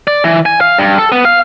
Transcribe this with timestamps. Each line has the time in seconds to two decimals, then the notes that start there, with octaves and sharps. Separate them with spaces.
0.07 D5
0.24 E3
0.46 G#5
0.61 F5
0.79 G2
0.98 A4
1.12 B3
1.25 F5